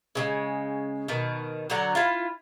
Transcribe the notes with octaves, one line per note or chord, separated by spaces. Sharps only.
C#3 F#3 G#3
B2 D#3
D3 F#3 F#5 A#5
E4 F4